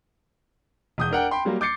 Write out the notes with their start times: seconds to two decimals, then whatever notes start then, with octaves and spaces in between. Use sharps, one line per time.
0.98 E1 D#6 G6
1.11 D4 A#4 F#5 G5
1.31 G5 B5 C6
1.45 F#3 G3 A#3
1.61 D6 G6 A6 C7 C#7